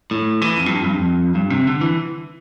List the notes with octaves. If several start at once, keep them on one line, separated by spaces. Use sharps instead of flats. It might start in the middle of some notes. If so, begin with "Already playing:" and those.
A2
E3
F2
G2
F2
G2
F2
G2
C3
D3
E3